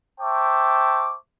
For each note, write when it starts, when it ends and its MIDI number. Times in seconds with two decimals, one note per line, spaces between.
0.21 1.16 72
0.21 1.16 76
0.21 1.16 79
0.21 1.16 81
0.21 1.16 85
0.21 1.16 86